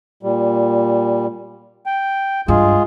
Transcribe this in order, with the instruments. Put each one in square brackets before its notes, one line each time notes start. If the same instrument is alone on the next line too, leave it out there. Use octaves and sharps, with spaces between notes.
[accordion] A#2 G3
G5
[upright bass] G2 [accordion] G#3 F4 G#4